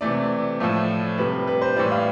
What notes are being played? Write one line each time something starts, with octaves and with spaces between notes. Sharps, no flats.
C3 E3 A3 D5
A2 F3 A3
C3 G3 B4
B4
C5
A2 E3 G3 D5
F5